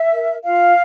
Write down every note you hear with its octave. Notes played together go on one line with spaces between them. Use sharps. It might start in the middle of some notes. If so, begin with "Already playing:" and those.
Already playing: E5
A#4
F4 F5